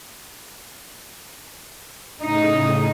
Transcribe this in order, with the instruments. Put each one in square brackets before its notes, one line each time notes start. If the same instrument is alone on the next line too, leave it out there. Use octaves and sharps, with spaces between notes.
[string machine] A2 C#3 [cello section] D#4